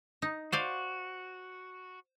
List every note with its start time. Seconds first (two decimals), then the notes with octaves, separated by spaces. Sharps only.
0.22 D#4
0.52 F#4 C5 D5 F5